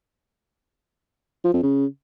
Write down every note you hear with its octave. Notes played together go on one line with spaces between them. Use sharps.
F3
F2
C#3